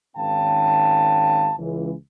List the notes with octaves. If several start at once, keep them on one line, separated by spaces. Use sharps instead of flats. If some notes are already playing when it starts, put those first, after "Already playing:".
G#1 D#3 C#4 F5 G5 A5
C#2 E3